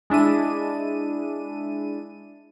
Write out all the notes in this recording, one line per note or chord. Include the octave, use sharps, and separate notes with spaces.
G#3 D4 E4 D#7